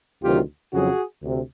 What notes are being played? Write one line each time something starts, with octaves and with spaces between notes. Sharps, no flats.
D2 C3 D#3 F#3 F4 G4
F2 C#3 F#3 F#4 G#4
D2 C3